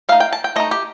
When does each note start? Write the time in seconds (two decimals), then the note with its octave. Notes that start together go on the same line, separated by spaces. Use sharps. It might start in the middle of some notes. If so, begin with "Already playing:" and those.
0.09 A3 F5
0.12 D#4
0.20 G5
0.33 A5
0.44 G5
0.56 A3 D#4 D#5
0.71 G4